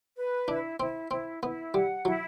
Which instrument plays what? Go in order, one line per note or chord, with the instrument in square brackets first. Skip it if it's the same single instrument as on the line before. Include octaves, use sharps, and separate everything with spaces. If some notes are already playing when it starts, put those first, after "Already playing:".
[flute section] B4
[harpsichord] D4 [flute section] E4
[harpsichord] C4 [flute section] E4
[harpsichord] C4 [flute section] E4
[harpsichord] B3 [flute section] E4
[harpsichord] G3 [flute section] F#5
[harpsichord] F#3 [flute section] E4